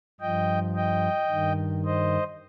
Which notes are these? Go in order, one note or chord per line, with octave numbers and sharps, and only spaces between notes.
G2 F3 D#5 G5
D#5 G5
G2 D#3
C5 D#5